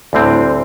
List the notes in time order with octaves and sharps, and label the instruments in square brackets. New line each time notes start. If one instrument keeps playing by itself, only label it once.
[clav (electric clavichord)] D2 D3 G3 C4 [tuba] A2